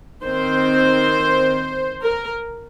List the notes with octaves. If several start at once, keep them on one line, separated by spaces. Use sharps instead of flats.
D#3 C4 C5
A#4